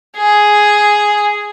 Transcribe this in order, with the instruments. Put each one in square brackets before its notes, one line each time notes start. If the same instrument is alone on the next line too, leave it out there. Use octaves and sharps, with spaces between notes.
[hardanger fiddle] G#4